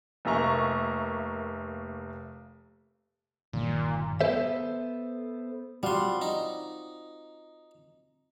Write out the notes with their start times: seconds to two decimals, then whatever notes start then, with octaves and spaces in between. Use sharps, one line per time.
0.25 F1 A#3 E5 A#5 C#6
3.53 G1 A#2 D#3
4.21 B3 A4 C5 E5
5.83 G3 C4 F4 F#4 C6
6.21 D#4